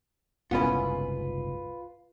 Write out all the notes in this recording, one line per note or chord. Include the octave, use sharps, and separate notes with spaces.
F#1 C2 G#2 B3 C#4 E4 F4 B4